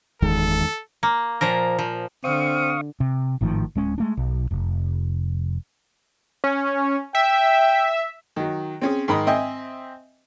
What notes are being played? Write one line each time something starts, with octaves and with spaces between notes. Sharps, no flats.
F#1 E2 D#3 G#3 A4
A#3
A#2 F3 A#4
F3
D3 C4 F5 C#6 D#6
C3
G#1 A2 D#3 F3
D1 G#3 C#4
G#3 A3 D4
B1
F1
C#4
E5 G5
D#3 F#3
C4 C#4 G#4
G#2 D#3 A#4 B5 D#6
C4 D#5 E5 G5 G#5